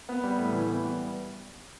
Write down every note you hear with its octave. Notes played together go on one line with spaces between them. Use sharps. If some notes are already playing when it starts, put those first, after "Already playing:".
B3
G3
A2
E3
B3
G3